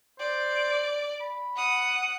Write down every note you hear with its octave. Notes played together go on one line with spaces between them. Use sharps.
C5 D5
B5
F#5 D#6